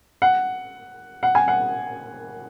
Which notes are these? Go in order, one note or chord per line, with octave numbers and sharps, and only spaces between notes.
F#5
F#5
G#5
F#5